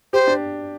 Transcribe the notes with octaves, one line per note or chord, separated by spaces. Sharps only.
G4 C5
D4